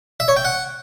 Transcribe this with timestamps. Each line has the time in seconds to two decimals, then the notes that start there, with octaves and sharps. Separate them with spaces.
0.20 E5
0.28 C#5
0.37 G5
0.45 F#5